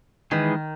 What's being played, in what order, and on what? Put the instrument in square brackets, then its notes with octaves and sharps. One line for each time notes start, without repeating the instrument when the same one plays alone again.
[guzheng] D#3 [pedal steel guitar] E3 G#3 D#4 G#4 B4